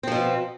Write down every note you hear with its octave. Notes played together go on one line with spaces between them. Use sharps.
B2 F3 C4